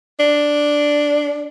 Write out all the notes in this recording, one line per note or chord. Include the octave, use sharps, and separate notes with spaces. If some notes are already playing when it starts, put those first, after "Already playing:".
D4